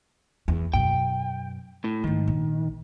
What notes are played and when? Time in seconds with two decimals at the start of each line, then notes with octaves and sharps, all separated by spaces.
0.48 E2
0.74 F#2 B2 G5
1.84 A2
2.04 G#2 D#3 A3
2.28 A#1